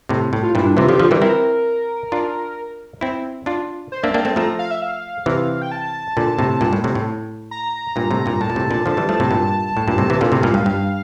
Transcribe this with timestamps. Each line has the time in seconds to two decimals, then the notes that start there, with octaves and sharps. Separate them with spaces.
0.09 A2 C3
0.33 A2
0.43 F4
0.55 G2 A#2 E4
0.66 D4
0.77 C3 E3 F4
0.88 D3 F3 G4
0.99 D3 F3 F4
1.11 E3 G3 A#4
1.22 C4 E4 A#4
2.12 D4 F4
3.01 C4 E4
3.46 D4 F4
3.92 C5
4.03 A#3 D4 E5
4.14 A#3 D4 G5
4.25 A3 C4 A5
4.36 F3 A3 A#5
4.59 F5
4.71 E5
4.82 F5
5.26 C3 E3
5.62 G5
5.72 A5
6.17 A#2 D3
6.39 A2 C3
6.61 G2 A#2
6.73 A2
6.84 A2 C3
6.95 A2
7.51 A#5
7.96 G2 A#2
8.11 A2 C3
8.26 G2 A#2
8.41 A2 A5
8.50 A#2
8.56 A2 C3
8.71 A#2 D3
8.86 D3 F3
8.97 E3 G3
9.09 F3 A3
9.20 A2 C3
9.31 G2 A#2
9.77 A2
9.88 G2 A#2
9.98 A2 C3
10.10 C3 E3
10.21 A#2 D3 F5
10.32 A2 C3
10.43 G2 A#2
10.54 G2
10.66 G2